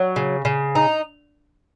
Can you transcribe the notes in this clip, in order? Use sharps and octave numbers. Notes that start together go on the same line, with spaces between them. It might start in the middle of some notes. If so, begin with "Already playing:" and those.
Already playing: F#3
C#3
C#3
D#4